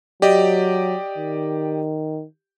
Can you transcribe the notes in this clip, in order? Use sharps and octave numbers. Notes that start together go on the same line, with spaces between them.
F#3 G4 D5 D#5
D#3